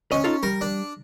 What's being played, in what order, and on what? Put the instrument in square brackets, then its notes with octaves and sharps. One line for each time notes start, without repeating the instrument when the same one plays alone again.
[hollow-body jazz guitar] D2 D#5 [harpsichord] C#4
[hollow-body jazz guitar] D#4 F4 A4
[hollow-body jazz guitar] G3 [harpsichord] A#4
[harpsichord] D4